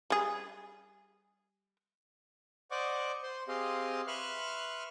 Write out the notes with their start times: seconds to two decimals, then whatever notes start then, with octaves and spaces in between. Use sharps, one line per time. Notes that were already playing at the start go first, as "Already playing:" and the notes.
0.10 G3 G#4
2.71 C5 D5 D#5 F#5 C#6 D6
3.23 C5 C6
3.48 C4 G4 G#4 D#5 F5 C6
4.07 B4 E5 C6 C#6 F6 F#6